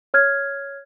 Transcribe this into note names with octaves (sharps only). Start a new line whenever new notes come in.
C#5 F6 G#6